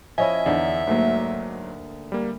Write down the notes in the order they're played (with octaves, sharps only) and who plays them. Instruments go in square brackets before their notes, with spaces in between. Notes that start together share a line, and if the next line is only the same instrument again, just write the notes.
[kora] F3 C#4 E4 [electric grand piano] D#5 G#5 [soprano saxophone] E5
[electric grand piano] E2 [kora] D3 D#4 G#4
[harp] D2 A#3 [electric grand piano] G#2 F#3
[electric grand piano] G3 A#3